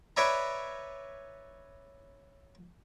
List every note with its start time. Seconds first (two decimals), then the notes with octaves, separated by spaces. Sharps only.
0.17 B4 C#5 D5 E5 G#5 A#5